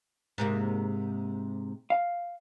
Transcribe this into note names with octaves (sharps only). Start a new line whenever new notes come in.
G#2 C3 A#3
F5